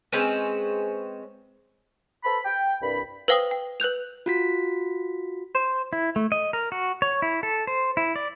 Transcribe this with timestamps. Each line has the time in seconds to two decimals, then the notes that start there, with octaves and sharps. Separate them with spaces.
0.12 G#3 C4 C#4 B4
2.24 A4 B4 C5 B5
2.45 G5
2.82 C2 G2 B5
3.28 B4 C5 F5 G5 D#6
3.51 G5
3.80 B4 F#6 G6 F7
4.26 F4 F#4 B6
5.55 C5
5.93 E4
6.16 A3
6.32 D#5
6.53 A#4
6.72 F#4
7.02 C#5
7.22 E4
7.43 A4
7.67 C5
7.97 E4
8.16 D5